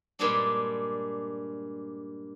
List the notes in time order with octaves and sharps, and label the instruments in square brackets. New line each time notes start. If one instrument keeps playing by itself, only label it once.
[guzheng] G2 A#2 G3 G#3 C4 D4